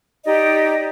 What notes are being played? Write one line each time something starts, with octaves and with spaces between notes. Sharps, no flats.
D#4 G4 D5 D#5